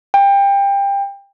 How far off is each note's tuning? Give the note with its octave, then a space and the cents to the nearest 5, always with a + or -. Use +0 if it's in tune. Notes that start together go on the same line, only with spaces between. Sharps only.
G5 +25